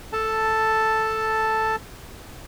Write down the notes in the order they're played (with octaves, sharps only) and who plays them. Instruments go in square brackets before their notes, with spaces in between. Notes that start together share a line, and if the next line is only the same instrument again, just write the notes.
[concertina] A4 A5